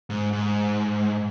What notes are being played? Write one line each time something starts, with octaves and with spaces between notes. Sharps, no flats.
G#2
G#2